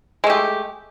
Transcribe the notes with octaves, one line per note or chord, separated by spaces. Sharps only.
G#3 A3 G4